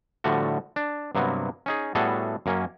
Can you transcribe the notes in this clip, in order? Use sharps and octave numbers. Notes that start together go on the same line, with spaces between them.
A2 D3 F3 G3 A3 F#4
D4
G2 C3 F#3 A#3 B3
C#4 D#4 G#4
A2 G3 B3 F#4 G#4 A4
F#2 A#3 C#4